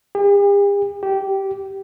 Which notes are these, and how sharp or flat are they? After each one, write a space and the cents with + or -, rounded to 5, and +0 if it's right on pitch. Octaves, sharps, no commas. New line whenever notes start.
G4 +45
G4 -15